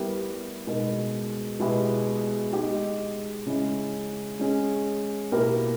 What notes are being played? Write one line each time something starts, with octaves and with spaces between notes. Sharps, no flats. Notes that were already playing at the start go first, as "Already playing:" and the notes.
Already playing: G3 B3 E4 G4 A#4
B2 G#3 D#4 A#4
B2 G#3 B3 E4 G4
G#3 D#4 G4
C#3 G#3 C#4 E4 G#4
G#3 C#4 G#4
B2 A#3 E4 G4 A#4